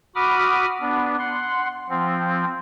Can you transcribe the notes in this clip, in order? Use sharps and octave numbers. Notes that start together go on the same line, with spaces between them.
F#4 B5 D6 D#6 F6
B3 D4
F#5 C6
F3 C4